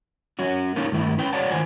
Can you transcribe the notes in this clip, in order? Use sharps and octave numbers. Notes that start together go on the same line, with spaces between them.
F#3 C#4 F#4
A#3 C#4 D#4 F4 A4
G2 D#3 A3 E4
C#4 B4 G5
F#3 C#5 D5 F#5 A5
D#3 F4 C5 G#5